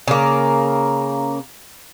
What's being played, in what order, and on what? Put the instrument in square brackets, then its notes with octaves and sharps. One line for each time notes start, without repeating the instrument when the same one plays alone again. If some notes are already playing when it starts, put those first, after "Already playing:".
[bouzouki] C#3 A#3